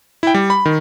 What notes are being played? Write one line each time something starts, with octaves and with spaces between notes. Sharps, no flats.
E4 G5
G3
B5
D#3